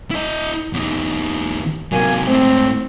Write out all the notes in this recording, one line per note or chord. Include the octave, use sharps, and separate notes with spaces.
E4 D#5
E2 D#4
C3 F#3 A#3 G#5
G#2 A3 C4